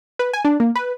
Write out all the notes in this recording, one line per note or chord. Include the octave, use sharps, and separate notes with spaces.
B4
G#5
D4
A#3
B4